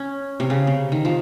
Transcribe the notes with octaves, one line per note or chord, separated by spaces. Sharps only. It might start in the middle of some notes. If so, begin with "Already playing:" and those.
Already playing: C#4
C3
C#3
C3
D#3
F3